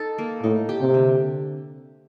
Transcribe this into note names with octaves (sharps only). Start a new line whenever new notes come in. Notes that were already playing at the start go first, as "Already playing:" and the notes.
Already playing: D#4 A4
A#3
A2 D#4
G4
C3
D3